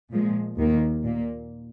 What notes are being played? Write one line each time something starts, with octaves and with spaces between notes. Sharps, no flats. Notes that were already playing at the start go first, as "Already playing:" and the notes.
A#2 F3 G#3
D#2 D#3 A#3
A#2 A#3